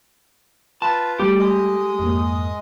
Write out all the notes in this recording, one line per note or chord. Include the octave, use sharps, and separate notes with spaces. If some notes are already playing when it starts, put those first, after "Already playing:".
F4 B4 A5
G3 A3 G4 A4
G#3 D#5 D#6
F2 G#2 A#3